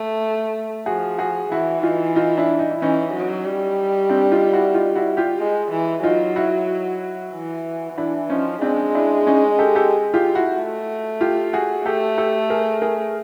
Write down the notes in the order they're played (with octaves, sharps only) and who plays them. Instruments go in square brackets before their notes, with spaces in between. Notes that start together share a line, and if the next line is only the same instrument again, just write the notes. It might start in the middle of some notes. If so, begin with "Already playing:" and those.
Already playing: [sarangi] A3
[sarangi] F3 [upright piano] F#4 G#4
[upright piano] F#4 G#4
[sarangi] E3 [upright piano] E4 F#4
[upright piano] D#4 F4
D#4 F4
D4 E4
D#4
E4
[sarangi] E3 [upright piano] C#4 D#4
[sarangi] F#3
G3
[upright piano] C4 D4
D#4 F4
E4 F#4
D#4 F4
E4 F#4
F4 G4
[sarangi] G#3
E3
[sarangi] F#3 [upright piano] D#4 F4
[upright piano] E4 F#4
[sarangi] E3
[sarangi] E3 [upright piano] D4 E4
[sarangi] F3 [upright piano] C#4 D#4
[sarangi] G#3 [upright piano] C4 D4
[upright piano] D4 E4
C#4 D#4
G4 A4
G4 A4
F4 G4
E4 F#4
[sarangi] A3
[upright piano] F4 G4
F#4 G#4
[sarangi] A3 [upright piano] G4 A4
[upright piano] G4 A4
G#4 A#4
G#4 A#4